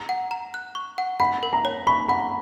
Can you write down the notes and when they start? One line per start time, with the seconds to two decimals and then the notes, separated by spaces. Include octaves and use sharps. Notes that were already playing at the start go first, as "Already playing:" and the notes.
Already playing: A#5
0.09 F#5
0.31 A#5
0.54 F#6
0.75 C#6
0.98 F#5
1.20 F#5 B5
1.43 A#4
1.53 A#5
1.65 C#5
1.87 B5 C#6
2.08 F#5 B5